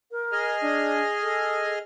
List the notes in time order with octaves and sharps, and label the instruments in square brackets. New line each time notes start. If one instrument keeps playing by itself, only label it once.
[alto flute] A#4
[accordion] G#4 D#5 F6
[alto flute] D4
A4